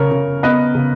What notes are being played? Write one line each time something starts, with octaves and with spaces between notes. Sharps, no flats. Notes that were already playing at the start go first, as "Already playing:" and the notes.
Already playing: C#3 A#4 C#5
C#3
B3 B4 D#5
C#3